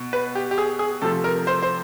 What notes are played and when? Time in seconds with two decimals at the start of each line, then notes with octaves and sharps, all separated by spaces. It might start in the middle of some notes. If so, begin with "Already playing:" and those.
Already playing: B2
0.13 B4
0.35 G4
0.51 G4
0.58 G#4
0.79 G#4
1.02 C3 F3 A3 A4
1.24 A#4
1.47 C5
1.62 C5